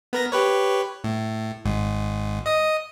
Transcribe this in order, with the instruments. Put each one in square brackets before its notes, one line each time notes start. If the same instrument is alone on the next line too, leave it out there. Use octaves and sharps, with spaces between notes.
[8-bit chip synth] B3 A#4 A#6
G4 B4 C#5
A2
G#1 G#2
D#5 D#6